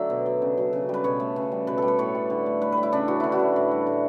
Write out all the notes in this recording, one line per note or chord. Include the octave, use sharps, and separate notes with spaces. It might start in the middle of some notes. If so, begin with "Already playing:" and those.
Already playing: D3 F#3 A3 D5 E5
B2
F#3
C#3
F#3
C#3
G3 B4
B2 C#5
A3
C#3
G3
B2 B4
G3 A4
B4
A2 C#5
G3
D3
A3
A2 B4
B4
G3
E4
C#3 D4
E3 F#4
D3 E4
F#4
A3
A2
G3
A2